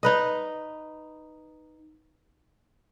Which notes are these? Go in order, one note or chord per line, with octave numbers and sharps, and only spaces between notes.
D#4 B4 D#5